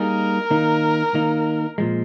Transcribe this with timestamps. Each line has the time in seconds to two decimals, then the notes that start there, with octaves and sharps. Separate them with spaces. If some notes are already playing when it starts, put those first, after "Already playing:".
Already playing: G3 A#3 D#4 G#4 A#4
0.50 D#3 A#3 D#4
1.14 D#3 A#3 D#4
1.78 A#2 F3 G#3